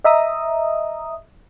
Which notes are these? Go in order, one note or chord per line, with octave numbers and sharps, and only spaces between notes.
D#5 E5 A#5 D#6